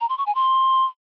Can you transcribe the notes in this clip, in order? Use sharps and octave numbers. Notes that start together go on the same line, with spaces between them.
A#5
C6
C#6
G#5
C6